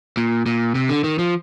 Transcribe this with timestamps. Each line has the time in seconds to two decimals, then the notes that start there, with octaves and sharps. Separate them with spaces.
0.17 A#2
0.46 A#2
0.75 C3
0.89 D3
1.04 D#3
1.19 F3